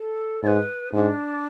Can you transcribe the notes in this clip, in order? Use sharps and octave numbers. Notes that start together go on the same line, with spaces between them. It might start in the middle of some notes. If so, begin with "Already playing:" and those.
Already playing: A4
G#2 B4 D5
G#2 D4